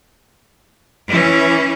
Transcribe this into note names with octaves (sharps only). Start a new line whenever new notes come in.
E3 C#4